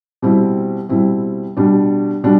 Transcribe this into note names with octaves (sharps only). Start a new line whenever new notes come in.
B2 G3 C4 E4
B2 G3 C4 E4
B2 G3 D4
B2 G3 D4